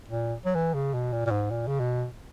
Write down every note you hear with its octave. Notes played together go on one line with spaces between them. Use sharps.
A#2
F#3
E3
C#3
B2
A#2
A#2
G#2
A#2
C#3
B2